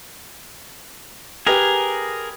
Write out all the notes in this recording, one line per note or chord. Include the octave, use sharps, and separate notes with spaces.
G4 G#4 A#4 B4